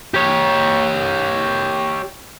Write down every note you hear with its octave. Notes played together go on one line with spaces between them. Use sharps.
G4 C#5